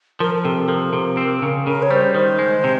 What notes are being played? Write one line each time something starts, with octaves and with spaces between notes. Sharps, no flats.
F3 A#4
A#4
C3 A4
F3 A#4
C3
C4
C#3
C#3 A#4
C#5
G3 C5
D#3 C5
G#3
C3